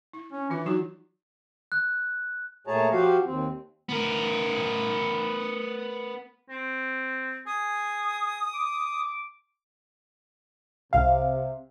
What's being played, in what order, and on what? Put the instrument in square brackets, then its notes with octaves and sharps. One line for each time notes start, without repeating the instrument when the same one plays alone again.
[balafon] E4
[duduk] C#4
[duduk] E3 [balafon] D4 F4
[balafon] E3 D#4 F#4 [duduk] F#3
[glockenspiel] F#6
[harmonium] A#2 A3 G#4 C#5 A5 A#5
F3 F#4 G4 F5
D#2 C4
[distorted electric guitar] B3 A#4
[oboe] C4
[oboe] G#4 [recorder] D#6
[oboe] D6
[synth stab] C2 F5 [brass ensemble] C3